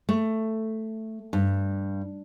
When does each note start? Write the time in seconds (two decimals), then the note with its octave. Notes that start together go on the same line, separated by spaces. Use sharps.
0.09 A3
1.33 G2